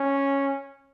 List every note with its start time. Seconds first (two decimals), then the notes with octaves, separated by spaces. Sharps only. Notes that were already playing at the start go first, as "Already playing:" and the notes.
Already playing: C#4